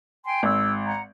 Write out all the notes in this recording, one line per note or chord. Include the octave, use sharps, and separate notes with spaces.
G5 G#5 C6
G#1 E6
F#5 A#5